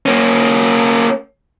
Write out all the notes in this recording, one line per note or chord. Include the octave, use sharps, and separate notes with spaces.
A#3 C#4